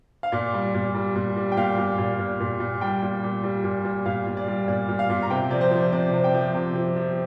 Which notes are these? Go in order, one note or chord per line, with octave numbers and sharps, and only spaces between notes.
F5
A#2 D5
G3
A#2
G3
A#2
G3
G5
A#2 F5
A#2
A#2
A#2
A#2
A#2
G3 G5
A#2
A#2
G3
A#2
A#2
A#2 F5
A#2
D5
G3
A#2 D5
A#2
F5
A#2
A#5
C3 G5
F3 D5
C5
F3
C3 D5
C3
G5
F3
C3
F3
F3